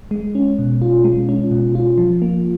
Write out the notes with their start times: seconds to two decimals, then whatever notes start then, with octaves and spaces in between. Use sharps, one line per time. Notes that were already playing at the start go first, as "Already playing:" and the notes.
0.11 G#3
0.35 C#4
0.59 B2
0.82 F4
1.05 G#3
1.29 C#4
1.52 B2
1.75 F4
1.98 F3
2.22 A#3